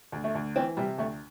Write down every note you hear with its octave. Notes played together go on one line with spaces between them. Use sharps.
D2
A3
D2
E3 C4
C3 G3
D2 A3